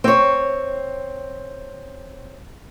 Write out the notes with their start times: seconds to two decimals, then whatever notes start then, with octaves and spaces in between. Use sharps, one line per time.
0.04 C4 C#5